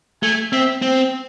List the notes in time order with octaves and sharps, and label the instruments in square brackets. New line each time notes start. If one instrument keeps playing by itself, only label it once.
[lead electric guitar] A3 [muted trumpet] G#5
[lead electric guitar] C4 [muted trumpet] E5
[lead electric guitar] C4